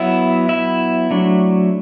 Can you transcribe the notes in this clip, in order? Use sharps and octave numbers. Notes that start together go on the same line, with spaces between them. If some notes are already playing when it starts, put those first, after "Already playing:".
Already playing: F#3 B3 E4 E5
E4 E5
F#3 A3 D4